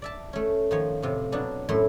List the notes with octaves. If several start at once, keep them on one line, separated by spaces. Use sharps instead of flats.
D5 E5 A5
A3 C#4
D#3 F3 C#5
A2 C3 F4
B2 F#3 B3 D4
F#2 A2 A3 E4 C6